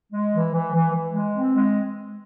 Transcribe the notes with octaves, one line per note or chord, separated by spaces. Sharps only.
G#3
E3
E3
E3
E3
G#3
C4
G#3